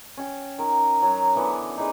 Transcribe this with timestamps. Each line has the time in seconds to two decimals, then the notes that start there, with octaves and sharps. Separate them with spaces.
0.17 C#4 G5
0.59 D#3 A#4
1.02 F#3 A#5
1.35 D3 E3 B3 C#4
1.77 D#4 G#4 B4 D5